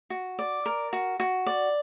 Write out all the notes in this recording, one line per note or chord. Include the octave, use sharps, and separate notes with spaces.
F#4
D5
A#4
F#4
F#4
D5